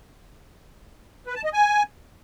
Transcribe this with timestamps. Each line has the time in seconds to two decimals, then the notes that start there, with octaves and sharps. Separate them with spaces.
1.26 B4
1.35 A5
1.44 D#5
1.53 G#5